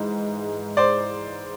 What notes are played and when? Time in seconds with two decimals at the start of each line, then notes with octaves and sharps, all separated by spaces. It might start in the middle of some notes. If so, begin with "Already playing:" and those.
Already playing: G#2 E3 G#3
0.77 C5 D5